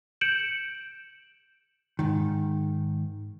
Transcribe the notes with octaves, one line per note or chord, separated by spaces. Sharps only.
G6 C#7 D7 E7 F#7
G#2 D#3